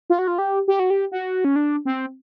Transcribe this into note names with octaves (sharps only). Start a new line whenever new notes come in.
F4
F#4
F4
G4
G4
F#4
G4
F#4
C#4
D4
C4